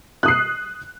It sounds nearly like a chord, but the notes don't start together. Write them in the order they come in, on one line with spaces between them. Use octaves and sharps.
F#6 D#6 C7